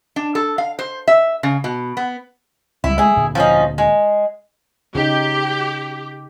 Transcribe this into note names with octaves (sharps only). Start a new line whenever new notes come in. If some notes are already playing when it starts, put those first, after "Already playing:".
D4
A4
F5
C5
E5
C#3
B2
B3
C#2 G3 E4
G#3 A3 E4 G#4
D2 A#2 D3
F3 C#4 D#4
G#3
C#3 D#4 G4